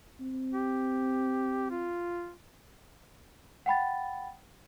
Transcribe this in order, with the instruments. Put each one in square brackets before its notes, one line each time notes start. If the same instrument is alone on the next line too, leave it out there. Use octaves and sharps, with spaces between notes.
[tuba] C4
[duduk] G4
F4
[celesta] F#5 G5 B5 A6